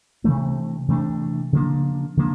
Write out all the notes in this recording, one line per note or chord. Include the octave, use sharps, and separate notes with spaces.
C3 E3 A3 D4
C3 E3 A3 D4
C#3 F3 A#3 D4
C#3 F3 A#3 D4